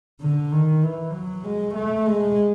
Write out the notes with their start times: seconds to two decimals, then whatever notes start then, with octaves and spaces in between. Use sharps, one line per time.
0.21 D3
0.52 D#3
0.83 E3
1.13 F#3
1.44 G#3
1.75 A3
2.06 G#3